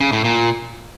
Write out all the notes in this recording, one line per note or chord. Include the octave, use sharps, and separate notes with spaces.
C#3
A2
A#2